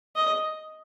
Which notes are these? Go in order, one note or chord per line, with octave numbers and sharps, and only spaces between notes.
D#5